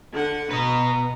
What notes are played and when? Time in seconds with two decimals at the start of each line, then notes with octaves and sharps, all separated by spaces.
0.13 D3 F#5
0.51 B2 B3 B4 D#5 A#5